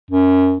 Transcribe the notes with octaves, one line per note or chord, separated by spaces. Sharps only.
F#2